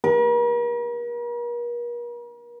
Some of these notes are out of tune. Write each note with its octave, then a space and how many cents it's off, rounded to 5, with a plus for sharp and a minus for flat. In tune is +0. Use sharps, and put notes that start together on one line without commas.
A#4 +45